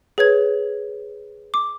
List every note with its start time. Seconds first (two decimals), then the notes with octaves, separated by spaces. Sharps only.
0.18 G#4 B4 C#5 G#6
1.54 D6